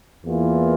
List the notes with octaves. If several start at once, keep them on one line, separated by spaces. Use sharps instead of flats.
E2 E3 A#3 F4